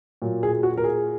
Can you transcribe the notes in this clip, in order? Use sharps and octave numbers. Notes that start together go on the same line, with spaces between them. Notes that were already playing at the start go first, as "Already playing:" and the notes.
A#2 F#3 A#3
G#4
F#4
A#4
G#4